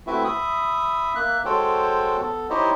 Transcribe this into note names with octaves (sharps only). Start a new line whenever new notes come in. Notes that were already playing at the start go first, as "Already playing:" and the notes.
A3 C4 E4 F#4 B4 E5
E5 B5 D#6
A#3 E5 F#6
G#3 F#4 A4 C5 C#5 G5
B3 A4
D#4 E4 G4 C5 C#5 D#5